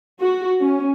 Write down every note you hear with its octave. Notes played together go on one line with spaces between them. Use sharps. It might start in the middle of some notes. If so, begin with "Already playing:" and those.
F#4
C#4